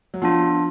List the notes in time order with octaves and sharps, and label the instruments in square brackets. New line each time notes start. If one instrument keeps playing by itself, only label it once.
[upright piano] F#3
[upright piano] F3 [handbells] B3 D4 F4